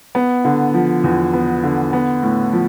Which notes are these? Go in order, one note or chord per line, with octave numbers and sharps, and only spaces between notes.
B3
D3
F3
E2
B3
D3
B3
A2
F3